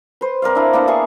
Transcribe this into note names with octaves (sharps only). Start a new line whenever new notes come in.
B4 C5
C4 A#4 D5 F5
D4 E4
A#3 B3 D4 E4
E4 G#4 F5 C#6